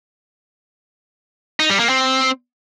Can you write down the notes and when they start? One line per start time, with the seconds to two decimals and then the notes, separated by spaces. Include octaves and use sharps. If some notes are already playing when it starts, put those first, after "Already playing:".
1.60 D#4
1.70 G3
1.79 A#3
1.89 C4